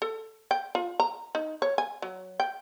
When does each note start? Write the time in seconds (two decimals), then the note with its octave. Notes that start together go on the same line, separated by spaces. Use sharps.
0.02 A4
0.51 G5
0.75 F4
1.00 A#5
1.35 D#4
1.62 C#5
1.78 G#5
2.02 F#3
2.40 G5